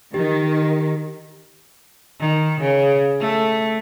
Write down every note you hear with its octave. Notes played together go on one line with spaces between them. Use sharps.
D#3 G4
D#3
C#3
A3